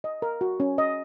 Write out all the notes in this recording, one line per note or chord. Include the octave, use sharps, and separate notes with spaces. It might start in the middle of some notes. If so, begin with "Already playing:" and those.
D#5
A#4
F#4
C#4
D#5